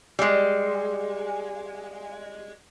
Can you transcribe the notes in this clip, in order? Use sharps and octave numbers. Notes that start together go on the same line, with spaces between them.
G3 G#3